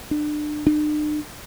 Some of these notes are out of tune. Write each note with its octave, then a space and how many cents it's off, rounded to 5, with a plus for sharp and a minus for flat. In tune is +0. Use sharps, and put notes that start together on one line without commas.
D4 +30
D4 +45